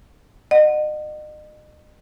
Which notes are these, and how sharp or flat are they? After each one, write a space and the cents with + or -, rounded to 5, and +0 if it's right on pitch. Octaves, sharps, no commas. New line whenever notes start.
D#5 -40 F#5 +0